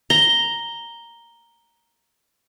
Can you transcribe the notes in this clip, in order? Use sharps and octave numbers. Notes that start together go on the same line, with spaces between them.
A#5 G7